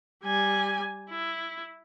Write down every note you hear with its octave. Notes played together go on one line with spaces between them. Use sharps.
G3 G#5
E4